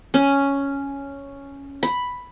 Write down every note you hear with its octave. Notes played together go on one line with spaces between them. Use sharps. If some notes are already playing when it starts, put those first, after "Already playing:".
C#4
B5